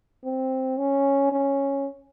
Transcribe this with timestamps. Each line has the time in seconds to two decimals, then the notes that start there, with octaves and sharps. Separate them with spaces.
0.25 C4
0.78 C#4
1.33 C#4